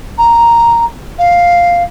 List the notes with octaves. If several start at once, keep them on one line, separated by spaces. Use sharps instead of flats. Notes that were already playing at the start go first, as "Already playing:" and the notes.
A#5
F5